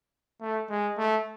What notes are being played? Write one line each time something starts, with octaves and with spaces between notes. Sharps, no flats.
A3
G#3
A3